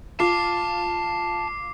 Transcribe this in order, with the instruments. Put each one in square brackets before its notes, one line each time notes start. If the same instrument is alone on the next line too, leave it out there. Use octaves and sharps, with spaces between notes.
[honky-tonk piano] F4 [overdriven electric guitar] A5 [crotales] D6 C7